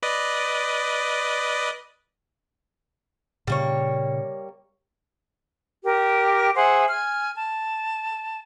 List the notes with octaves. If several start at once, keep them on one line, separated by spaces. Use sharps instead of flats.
B4 D5 D#5
A#2 C#3 G3 A#3 C#5
G4 A#4
G#4 C5 E5 F#5
G#5 F6
A5